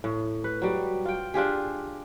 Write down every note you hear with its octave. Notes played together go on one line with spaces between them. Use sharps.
A2
B4
F#3 G3
F4 G5
D4 F4 G4 G#4